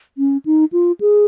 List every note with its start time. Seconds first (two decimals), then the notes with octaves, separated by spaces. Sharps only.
0.18 C#4
0.46 D#4
0.73 F4
1.01 G#4